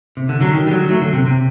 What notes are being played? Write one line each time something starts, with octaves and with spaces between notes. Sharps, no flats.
C3
D3
D3 F#3
D#3
G3
D3 F#3
F#3 A3
D3
C3
C3